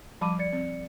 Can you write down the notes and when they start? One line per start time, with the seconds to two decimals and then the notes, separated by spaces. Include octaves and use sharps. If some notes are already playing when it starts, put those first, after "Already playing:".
0.21 F3 G3 A5 B5 D6 D#7
0.39 D5 A6 C#7
0.53 C4